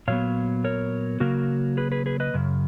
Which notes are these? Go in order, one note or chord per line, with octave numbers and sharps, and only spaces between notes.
A#2 F#3 B3 C#5 F5
A#4 C#5
C#3 F#3 A#3 F#4 A#4
G#4 B4
G#4 B4
G#4 B4
B4 D#5
F#2 C#3